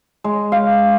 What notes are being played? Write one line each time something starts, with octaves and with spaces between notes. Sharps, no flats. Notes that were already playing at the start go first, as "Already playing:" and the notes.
G#3
F5